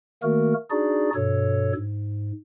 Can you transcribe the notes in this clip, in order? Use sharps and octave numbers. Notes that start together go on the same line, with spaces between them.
D#3 A3 A#3 F#4 A#4
D4 D#4 F#4 G#4 D5
G2 B2 A4 C#5
G#2